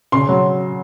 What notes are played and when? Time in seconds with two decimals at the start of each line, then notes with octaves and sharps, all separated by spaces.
0.12 C#3 C6
0.29 F#3